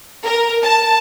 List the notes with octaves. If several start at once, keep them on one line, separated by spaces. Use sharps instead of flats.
A#4
A5